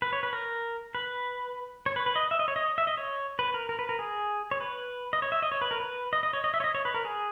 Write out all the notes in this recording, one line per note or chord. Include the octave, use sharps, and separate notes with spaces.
B4
C#5
B4
A#4
B4
C#5
B4
B4
D#5
E5
D#5
C#5
D#5
E5
D#5
C#5
B4
A#4
A#4
B4
A#4
G#4
C#5
B4
D#5
C#5
E5
D#5
C#5
B4
A#4
B4
D#5
D#5
C#5
D#5
E5
C#5
D#5
C#5
B4
A#4
G#4